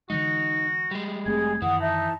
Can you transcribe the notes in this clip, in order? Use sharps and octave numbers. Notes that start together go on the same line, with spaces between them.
D3 E3 G#3 D#4 F#4
G3 G#3
F1 A3 C4 G#4 G#5
F#2 D#3 E3 F#5 D#6
D#4 E5 A5